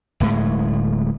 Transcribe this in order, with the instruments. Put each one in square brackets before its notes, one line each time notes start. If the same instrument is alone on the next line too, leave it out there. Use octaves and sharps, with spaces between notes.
[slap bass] D1 A2 G#3